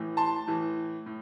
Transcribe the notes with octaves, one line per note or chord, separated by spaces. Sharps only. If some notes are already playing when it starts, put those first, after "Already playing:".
Already playing: A2 E3
A5 C6
A2 E3
A2